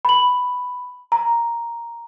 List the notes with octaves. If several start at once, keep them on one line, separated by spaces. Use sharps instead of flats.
B5 F#7
A#5